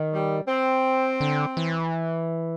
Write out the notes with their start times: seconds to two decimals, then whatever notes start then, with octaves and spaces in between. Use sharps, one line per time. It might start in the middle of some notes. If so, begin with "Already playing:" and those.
Already playing: D#3
0.12 G3
0.47 C4
1.20 D3
1.57 E3